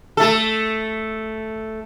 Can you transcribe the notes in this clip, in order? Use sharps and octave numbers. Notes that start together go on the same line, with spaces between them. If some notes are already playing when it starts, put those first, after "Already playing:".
A3 A4